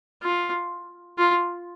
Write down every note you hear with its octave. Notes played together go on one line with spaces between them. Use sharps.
F4
F4